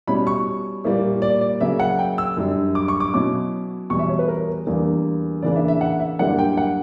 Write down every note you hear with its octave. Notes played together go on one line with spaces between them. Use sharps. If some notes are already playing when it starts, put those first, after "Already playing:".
B2 G3 C#4 E4 B5
C#6
A#2 G3 A#3 E4
D5
D5
C#3 F#3 A#3 E5
F#5
G5
E6
F#2 D3 G3
D6
C#6
D6
B2 F#3 C#4 E4 D6
E2 B2 G3 C#6
E5
C#5
B4
A#4
E2 D3 G3 A#3
C#3 E3 A#3 D4 D5
E5
E5
F#5
E5
F#2 D3 G3 A#3 E4 F#5
G5
F#5